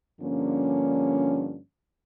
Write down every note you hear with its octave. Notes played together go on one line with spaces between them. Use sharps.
G2 D3 F3 A#3 C#4